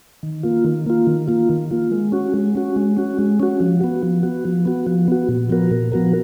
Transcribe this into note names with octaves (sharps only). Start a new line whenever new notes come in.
D#3
A#3 F4
D#3
A#3 F4
D#3
A#3 F4
D#3
A#3 F4
G#3
C#4 F#4
G#3
C#4 F#4
G#3
C#4 F#4
G#3
C#4 F#4
F3
B3 F#4
F3
B3 F#4
F3
B3 F#4
F3
B3 F#4
A#2
F3 B3 F#4 A#4
A#2
F3 B3 F#4 A#4